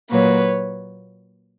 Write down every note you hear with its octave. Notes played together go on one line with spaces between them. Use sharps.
A#2 F#3 A#3 B4 C#5